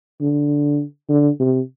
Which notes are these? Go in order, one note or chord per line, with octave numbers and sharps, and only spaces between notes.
D3
D3
C3